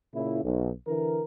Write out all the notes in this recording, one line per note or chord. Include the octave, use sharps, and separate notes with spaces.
A#2 C#3 E4
B1
D3 E3 A#4